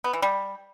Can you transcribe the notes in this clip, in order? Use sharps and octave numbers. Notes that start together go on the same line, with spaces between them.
B3
E3
G3